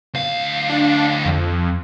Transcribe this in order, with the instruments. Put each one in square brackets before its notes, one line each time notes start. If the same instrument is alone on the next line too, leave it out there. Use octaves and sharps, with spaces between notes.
[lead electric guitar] D2 F5
[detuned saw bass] D4
F2